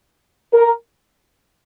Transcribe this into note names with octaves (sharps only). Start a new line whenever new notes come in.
A#4